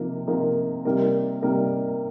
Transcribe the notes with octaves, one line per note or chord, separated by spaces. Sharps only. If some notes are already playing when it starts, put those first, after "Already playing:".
Already playing: C3 F3 A#3 D#4 A#4
C3 F3 A#3 D#4 A#4
C3 G3 A#3 D#4 A#4
C3 G3 A#3 D#4 A#4